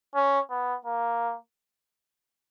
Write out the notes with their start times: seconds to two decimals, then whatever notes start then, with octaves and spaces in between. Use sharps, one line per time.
0.15 C#4
0.50 B3
0.85 A#3